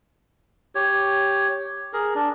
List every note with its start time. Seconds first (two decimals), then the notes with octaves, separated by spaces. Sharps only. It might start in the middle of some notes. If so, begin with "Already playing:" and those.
0.75 G4 C#5
1.93 G#4 A#4
2.15 D4